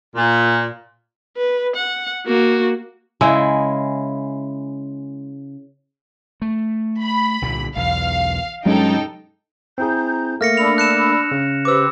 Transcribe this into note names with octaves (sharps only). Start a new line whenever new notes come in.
A#2
B4
F#5
A#3 F#4
C#3 G#3 E4
A3
B5
C2 A#2 D3
B1 E2 F5
G2 F#3 G#3 C#4 D#4 A4 G5
C4 E4 G#4 A#5 G6
A3 A#3 F6 A#6 C#7
D4 B5 E6 F7
F#6 C#7 E7
C#3
G4 B4 C5 D6 E6